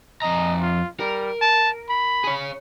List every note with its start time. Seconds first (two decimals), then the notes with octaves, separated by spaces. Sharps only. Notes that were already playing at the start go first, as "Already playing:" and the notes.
0.22 F2 D#5 A#5
0.61 F4
1.00 G3 A#4
1.41 A5
1.89 B5
2.24 G#4 C#5